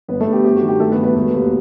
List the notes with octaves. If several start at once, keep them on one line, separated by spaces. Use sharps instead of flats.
G1 B3 B4
A3 A4
G2
G4
C4 G4
F#4
D#3
G4
G2 A3 A4
B3 B4
F#3
B3 B4
E1
D#2